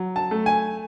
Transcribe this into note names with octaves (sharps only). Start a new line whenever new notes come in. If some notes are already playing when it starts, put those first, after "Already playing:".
Already playing: F#3
A5
A3
G#5